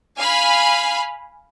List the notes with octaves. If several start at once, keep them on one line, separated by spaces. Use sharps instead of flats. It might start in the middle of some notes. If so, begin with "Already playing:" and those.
F5 G#5 B5